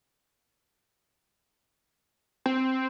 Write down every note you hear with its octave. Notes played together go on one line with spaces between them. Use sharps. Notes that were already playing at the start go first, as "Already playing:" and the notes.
C4